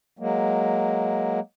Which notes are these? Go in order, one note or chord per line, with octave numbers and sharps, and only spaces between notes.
F#3 G#3 A#3